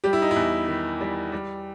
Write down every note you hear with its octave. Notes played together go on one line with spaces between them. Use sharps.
G3 G4
E4
D#4
E4
E2
D#3
G3
G3